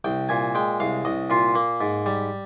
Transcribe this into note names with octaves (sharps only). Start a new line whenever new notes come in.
C2 G5
A#2 G#5
G#3 G5
C2 F5
C2 D#5
A#2 F4
A#3
G#2
G3